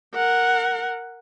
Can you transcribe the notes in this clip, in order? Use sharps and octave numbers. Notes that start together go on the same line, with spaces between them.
A#4 F#5